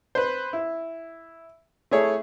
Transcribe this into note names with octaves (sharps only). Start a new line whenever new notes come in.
B4 C5
E4
A3 E4 G#4 C#5